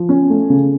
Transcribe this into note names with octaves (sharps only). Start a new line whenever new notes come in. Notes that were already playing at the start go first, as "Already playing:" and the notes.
Already playing: F3
C#4
A3
C#3